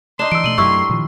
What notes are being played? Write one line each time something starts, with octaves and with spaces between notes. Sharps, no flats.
D4 D#4 D#5 C6 E7
E3 E6 D7
B2 A3 D#7 F#7
F#2 F#3 A3 E4 G4 A#4 C#6 E6
A#2 D#3 F3